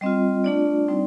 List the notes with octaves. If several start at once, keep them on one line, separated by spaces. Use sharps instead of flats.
G3 C4 F4 D#5
A3 D4 F4 D5
G3 C4 D#4